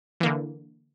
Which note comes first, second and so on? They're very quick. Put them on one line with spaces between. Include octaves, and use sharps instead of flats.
E3 A#3 D3